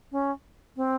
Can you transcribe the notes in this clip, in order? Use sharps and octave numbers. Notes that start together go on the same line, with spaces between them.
C#4
C4